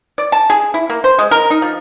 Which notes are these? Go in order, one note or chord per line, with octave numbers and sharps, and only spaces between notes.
D5
A5
G#4
E4
A#3
C5
G#3
A#4
D#4
F3